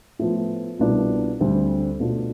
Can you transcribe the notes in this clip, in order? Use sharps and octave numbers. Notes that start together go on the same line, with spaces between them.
A2 F3 B3 F4
C2 B2 B3 D4 F4
D2 D3 G3 C4
B2 A3 D4 F4